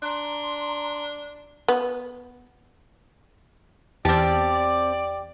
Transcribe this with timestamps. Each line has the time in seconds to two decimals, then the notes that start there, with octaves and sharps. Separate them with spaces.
0.03 D4 A#5 C6
1.68 B3
4.05 E2 C4 G4 D5 A5 F6